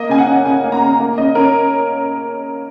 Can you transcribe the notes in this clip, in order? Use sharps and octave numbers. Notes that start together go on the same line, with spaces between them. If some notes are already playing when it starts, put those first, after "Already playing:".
Already playing: A#3 D#5
C#3 G#5
F#5
C#4
C#3 G#5
A#3
A#5
C#3
A#3
C#3 D#5
C#4 A#4